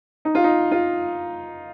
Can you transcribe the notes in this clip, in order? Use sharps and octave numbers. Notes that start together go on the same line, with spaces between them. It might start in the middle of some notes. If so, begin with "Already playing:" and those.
D#4
F4
D#4
F4